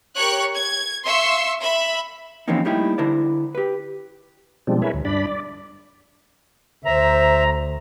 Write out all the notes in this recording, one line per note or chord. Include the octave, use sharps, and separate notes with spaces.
G4 A#4 C#5 C#6 F#6
G#6
E5 F5 C6 C#6 E6
E5 B5
E3 F3 A#3 C4 C#4 D#4
G3 A3 A#3 D#4 E4 G4
D3 E4 A#4 C5 D5
G4 B4
B2 F3 G3 G#3 C4 D4
E4 G#4 A#4 B4 C#5 E5
D2
G2 D4 D5 B5
D5
D2 C5 E5 A#5